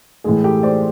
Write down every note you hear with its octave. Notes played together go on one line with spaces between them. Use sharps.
A2 E3 G#3 G#4
G4 A4
C5 D5